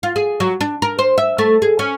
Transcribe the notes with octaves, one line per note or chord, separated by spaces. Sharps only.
F4
G#4
F#3
D4
A#4
C5
E5
A3
G#4
C#4